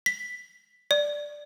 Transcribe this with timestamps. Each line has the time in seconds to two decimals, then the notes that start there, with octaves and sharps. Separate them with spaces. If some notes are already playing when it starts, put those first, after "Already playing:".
0.06 B6
0.91 D5